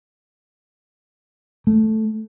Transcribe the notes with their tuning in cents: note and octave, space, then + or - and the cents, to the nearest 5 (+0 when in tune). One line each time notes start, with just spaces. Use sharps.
A3 -5